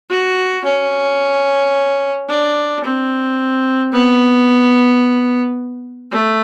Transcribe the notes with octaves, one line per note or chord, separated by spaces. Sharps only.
F#4
C#4
D4
C4
B3
A3